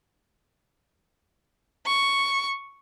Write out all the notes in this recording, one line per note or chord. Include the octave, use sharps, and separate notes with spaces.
C#6